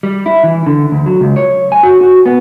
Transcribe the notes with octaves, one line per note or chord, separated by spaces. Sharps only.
G3
E4
E3
D3
D2
F#3
C#2
C#5
G#5
F#4
F#4
B3